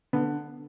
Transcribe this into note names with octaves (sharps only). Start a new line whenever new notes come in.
D3 B3